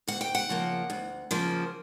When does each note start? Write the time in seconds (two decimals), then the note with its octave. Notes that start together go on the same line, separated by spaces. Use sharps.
0.08 D2 F#5
0.21 G5
0.35 F#5
0.49 C#3 F3 A#3
0.90 D2
1.31 C#3 F3 A#3